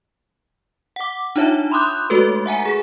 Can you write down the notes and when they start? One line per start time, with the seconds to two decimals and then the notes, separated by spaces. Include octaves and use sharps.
0.96 F#5 D6
1.36 D4 D#4 F4 C#5 E5 A5
1.71 B5 C6 D6 D#6 F#6 G6
2.10 G#3 A3 F#4 A4 B4
2.46 E5 F#5 G#5 A#5
2.65 G#4